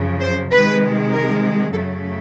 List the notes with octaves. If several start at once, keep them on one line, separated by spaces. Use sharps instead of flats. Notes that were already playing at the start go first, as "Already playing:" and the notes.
Already playing: F#2 C#3 F3
C5
C3 D#3 G#3 B4
A#4
F#2 C#3 F#3 A3 A4